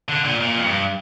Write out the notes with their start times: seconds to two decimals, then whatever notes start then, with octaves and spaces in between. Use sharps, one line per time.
0.09 D3
0.25 A#2
0.41 A#2
0.56 F2
0.65 G2